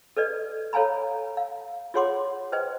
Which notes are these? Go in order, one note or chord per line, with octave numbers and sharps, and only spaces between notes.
A4 B4 D5 D#5
A4 C#5 F5 G#5 A#5 B5
F5
F4 G#4 C#5 F#5 C6 D6
B4 C5 D#5 G5